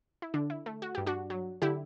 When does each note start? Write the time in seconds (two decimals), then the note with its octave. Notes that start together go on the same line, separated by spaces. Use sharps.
0.22 E4
0.34 D3 D4
0.50 E4
0.66 A3
0.82 F#4
0.95 G2 G4
1.06 D4 F#4
1.30 F#3
1.62 D3 E4 G4